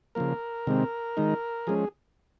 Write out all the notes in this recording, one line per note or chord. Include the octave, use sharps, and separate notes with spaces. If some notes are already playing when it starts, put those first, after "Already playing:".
C#3 F3 A#3 A#4
C3 D#3 G#3 C4
D#3 G#3 D#4
F3 G#3 C#4 G#4